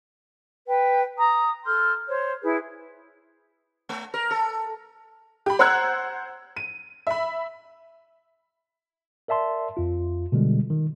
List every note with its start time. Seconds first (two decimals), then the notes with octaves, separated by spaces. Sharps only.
0.68 B4 G5
1.18 A#5 D#6
1.66 A4 C6 F6 G6
2.08 C5 C#5
2.43 E4 G#4 B4
3.89 A3
4.14 A#4
4.31 A4
5.46 G4 B5
5.59 C5 F#5 A#5 E6 F#6 G#6
6.57 D#7
7.07 E5 B5
9.28 A#4 D5 E5 A5 C6
9.77 F2 F4
10.32 B2 D3 G3 G#3
10.70 D#3